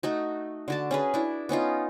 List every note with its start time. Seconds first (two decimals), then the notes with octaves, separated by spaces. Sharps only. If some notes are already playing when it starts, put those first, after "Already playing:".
0.03 A3 D#4 F#4
0.68 D3 F#4 A5
0.91 C#4 G#4 B4
1.14 D4 E4
1.49 B3 C#4 D#4 F4